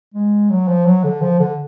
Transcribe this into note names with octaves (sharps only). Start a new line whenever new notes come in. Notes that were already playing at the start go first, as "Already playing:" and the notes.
G#3
F#3
F3
F#3
D3
F3
D3